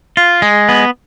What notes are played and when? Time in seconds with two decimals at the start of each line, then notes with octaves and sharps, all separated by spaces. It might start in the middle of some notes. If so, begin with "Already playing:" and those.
0.17 F4
0.42 G#3
0.69 B3